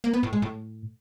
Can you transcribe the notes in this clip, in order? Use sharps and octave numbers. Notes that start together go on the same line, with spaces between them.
A#3
B3
A2
G#3
A2